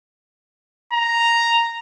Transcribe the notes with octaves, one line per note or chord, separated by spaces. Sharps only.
A#5